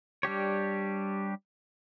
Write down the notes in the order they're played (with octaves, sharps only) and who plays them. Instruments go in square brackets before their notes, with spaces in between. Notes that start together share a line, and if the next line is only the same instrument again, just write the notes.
[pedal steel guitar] G3 D4 G4 C#5